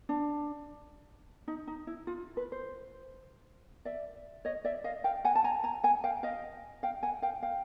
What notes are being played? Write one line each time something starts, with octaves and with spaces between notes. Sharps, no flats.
D4
D#4
D#4
E4
F4
B4
C5
D5 E5
C#5 D#5
D5 E5
D#5 F5
F5 G5
F#5 G#5
A5
G#5 A#5
G#5 A#5
F#5 G#5
F5 G5
D#5 F5
F5 G5
F#5 G#5
F5 G5
F5 G5